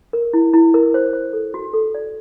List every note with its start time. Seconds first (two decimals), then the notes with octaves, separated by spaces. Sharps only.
0.13 A#4
0.33 E4
0.53 E4
0.74 A#4
0.94 C5
1.13 C5
1.33 A4
1.54 F#4
1.73 A4
1.95 D5